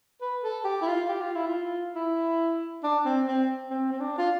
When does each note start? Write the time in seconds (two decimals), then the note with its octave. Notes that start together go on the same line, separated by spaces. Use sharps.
0.21 B4
0.44 A4
0.65 G4
0.82 E4
0.87 F4
1.09 G4
1.21 F4
1.35 E4
1.48 F4
1.96 E4
2.83 D4
3.05 C4
3.28 C4
3.70 C4
3.92 C4
4.00 D4
4.18 F4